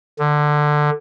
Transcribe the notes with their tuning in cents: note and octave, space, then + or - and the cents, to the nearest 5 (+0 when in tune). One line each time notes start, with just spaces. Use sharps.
D3 +15